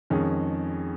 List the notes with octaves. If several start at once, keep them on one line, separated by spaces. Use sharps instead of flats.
F2 D#3 G#3 C#4 G#4